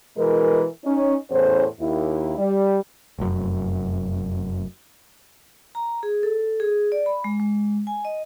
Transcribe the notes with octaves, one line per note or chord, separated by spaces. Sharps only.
B2 E3 G#3 A#4
C#4 D#4
E2 A2 C#4 C5
D#2 E4
G3
F1 F#2
A#5
G#4
A4
G#4
D5
B5
G#3
G#3
G#5
D#5